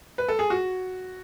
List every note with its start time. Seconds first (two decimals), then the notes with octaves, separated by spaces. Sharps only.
0.18 B4
0.28 A4
0.39 G#4
0.50 F#4